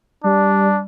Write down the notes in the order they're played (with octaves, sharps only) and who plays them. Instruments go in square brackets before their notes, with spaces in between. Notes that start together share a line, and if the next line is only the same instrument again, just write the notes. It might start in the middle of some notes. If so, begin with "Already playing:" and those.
[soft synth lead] G3 [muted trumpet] D4